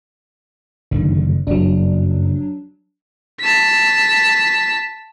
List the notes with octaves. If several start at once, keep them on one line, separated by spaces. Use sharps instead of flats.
F#1 G2 D3 D#3
F#1 G2 F#3 D4
A5 B6